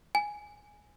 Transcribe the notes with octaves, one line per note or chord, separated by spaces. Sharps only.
G#5